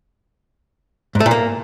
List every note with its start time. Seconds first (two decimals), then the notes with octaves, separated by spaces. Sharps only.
1.15 G#2
1.20 A3
1.26 A#2
1.31 A#3